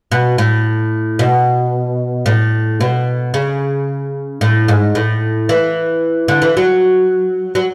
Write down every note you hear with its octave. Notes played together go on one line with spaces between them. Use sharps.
B2
A2
B2
A2
B2
C#3
A2
G#2
A2
E3
D3
E3
F#3
F#3